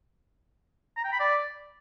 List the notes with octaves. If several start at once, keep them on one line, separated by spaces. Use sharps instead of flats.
A#5
G5
B5
D5